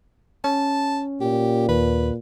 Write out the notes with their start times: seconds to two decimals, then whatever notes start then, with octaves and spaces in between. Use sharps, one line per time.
0.44 C#4 A5
1.21 A#2 G4
1.69 D#2 B4